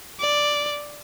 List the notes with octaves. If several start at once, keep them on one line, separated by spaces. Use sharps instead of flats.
D5